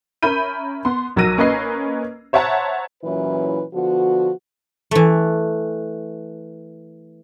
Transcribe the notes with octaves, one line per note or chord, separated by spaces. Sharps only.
C#4 A#4 E5 B5 G6 D#7
B3 C6
B1 F#3 A#4 E6 A#6 D#7
A#3 C#4 B4 D#5 C7
C5 C#5 E5 F#5 A5 A#5
A#2 E3 F#3 C#4 E4 B4
D3 F3 B3 F#4
E3 A3